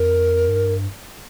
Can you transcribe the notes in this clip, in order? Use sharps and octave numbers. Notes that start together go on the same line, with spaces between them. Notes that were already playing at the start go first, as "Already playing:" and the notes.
Already playing: F2 A#4
G2